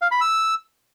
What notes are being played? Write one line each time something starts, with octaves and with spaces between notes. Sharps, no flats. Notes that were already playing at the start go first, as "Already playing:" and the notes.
F5
B5
E6